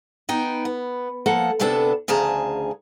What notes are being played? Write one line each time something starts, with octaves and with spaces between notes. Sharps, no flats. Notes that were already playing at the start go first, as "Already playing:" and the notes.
B3 D#4 G5
B3
F3 A#3 A4 F#5
D2 C3 B3 D4 A4 A5
D2 C#3 F3 G#4 A5 A#5